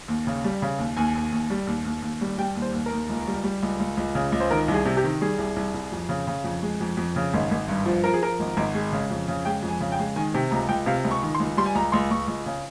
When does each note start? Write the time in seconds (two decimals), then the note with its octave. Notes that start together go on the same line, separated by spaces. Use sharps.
0.08 D#2
0.27 C#3
0.44 G3
0.62 C#3
0.79 D#2
0.97 D#2 G#5
1.15 D#2
1.32 D#2
1.50 G3
1.67 D#2
1.85 D#2
2.02 D#2
2.21 G3
2.38 G3 G5
2.55 D#2
2.62 C5
2.74 D#2
2.86 A#4
2.92 D#2
3.10 C#2
3.27 G3
3.44 G3
3.63 C#2
3.80 C#2
3.97 C#2
4.15 C#3
4.32 C#2
4.40 C5
4.51 D#3 A#4
4.68 C2
4.74 G#4
4.85 C3
4.97 G4
5.04 D#3
5.21 G3 G#4
5.38 C2
5.56 C2
5.74 C2
5.92 F2
6.09 C#3
6.27 C#3
6.44 F2
6.62 G#3
6.81 F2
6.97 F2
7.16 C#3
7.34 G#1
7.51 G#1
7.68 G2
7.86 F3
8.04 F3 A#4
8.14 G#4
8.22 F3 A#4
8.40 G#1
8.57 G#1
8.74 G#3
8.92 C#3
9.10 F2
9.28 C#3
9.45 G#3 G5
9.63 F2
9.68 G#5
9.81 C#3
9.92 G5
9.99 G#3
10.16 D#3 G#5
10.34 C3 G5
10.51 C#2 A#5
10.69 C#2 G5
10.86 C3 F5
11.04 C#2
11.11 C#6
11.23 D#3
11.35 C6
11.40 C#2
11.57 G3 C6
11.66 G#5
11.75 C#2 A#5
11.92 C#2 C6
12.11 C#2 C#6
12.28 C#2
12.46 C#3